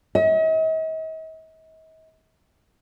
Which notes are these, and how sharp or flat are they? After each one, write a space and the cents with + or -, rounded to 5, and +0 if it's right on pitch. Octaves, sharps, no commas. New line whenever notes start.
D#5 +45